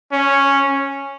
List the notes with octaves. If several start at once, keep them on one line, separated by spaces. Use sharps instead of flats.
C#4